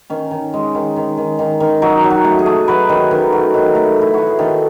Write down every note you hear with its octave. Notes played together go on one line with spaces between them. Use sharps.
D#3 C#4
D#3
G#3
D#3
D#3
D#3
D#3
D#3
F#3 D#4
F#3
F#4
A3
G#4
A3
F#3 B4
D#3
D#3
F#3
D#3
A3
A3
E4
A3 F#4
G#4
D#3 A4